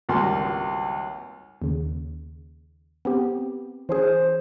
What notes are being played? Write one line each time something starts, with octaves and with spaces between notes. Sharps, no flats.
G#1 C#2 F#2 G3 A#3 C6
D#2 C#3
B3 C4 G4
E3 C#4 G#4 C5